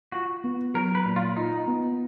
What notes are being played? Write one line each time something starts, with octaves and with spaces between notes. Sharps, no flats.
F4 F#4
B3
F#3 A#4
B4
A#2
F4
D#4 F4
B3